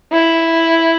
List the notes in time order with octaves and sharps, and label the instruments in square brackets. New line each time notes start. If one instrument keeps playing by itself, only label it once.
[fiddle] E4